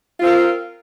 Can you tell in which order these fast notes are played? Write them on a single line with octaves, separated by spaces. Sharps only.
F4 C4 A#4